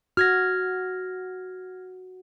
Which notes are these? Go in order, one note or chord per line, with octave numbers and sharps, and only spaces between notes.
F#4 F6 G#6 A#6